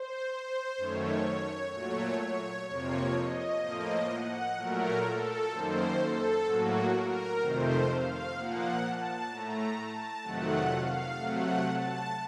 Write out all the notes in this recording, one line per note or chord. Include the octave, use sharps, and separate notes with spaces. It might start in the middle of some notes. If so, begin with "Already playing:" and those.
Already playing: C5
C5
F#2 D#3 A3 C#5
A#2 F#3 A3 C#5
C#5
F2 C3 F3 A#3 C#5
D#5
A2 F3 A#3
F#5
A#2 F#3 A3 A#4
A4
F#2 D#3 A#3 C5
A4
A2 F#3 A#3 F#4
A#4
F2 C3 D#3 A3 C5
F5
A#2 F3 A#3 F#5
A5
A2 A3 A#5
A5
F2 C3 D#3 F#3 A3 F#5
F5
C3 F#3 A3 F#5
A5